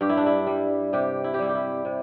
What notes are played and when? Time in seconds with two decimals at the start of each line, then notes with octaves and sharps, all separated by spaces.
0.01 G2 G4
0.09 E4
0.17 D4
0.26 E4
0.47 G3
0.93 C3 G4
1.24 E4
1.34 G4
1.39 G3 E4
1.49 G4
1.55 E4
1.85 C3